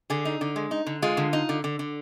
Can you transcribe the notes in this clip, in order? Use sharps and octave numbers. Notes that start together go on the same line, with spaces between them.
D3 G#4
D#4
D3
G#3
D#4
D3
G#3 F4
D3
D#4
D3
D3
D3